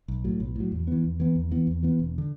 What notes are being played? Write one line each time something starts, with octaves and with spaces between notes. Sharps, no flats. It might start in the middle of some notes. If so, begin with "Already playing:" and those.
B1
A2 F#3
B1
A2 F#3
E2
E3 B3
E2
E3 B3
E2
E3 B3
E2
E3 B3
E1
D3